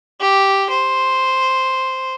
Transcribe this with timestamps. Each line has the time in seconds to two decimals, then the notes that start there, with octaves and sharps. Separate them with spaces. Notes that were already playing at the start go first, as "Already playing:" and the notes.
0.20 G4
0.70 C5